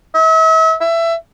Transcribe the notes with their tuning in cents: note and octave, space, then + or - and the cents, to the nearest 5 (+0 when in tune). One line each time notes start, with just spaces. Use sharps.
E5 -40
E5 +20